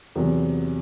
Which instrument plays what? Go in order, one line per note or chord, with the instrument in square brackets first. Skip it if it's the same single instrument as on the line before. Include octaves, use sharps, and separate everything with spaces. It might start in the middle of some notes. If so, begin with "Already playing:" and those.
[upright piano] E2 C3 F#3 B3